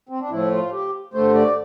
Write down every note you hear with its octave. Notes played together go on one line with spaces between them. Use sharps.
C4
D4
A2 F3 A3 E4
F4
G4
G2 D3 A3 C5
D5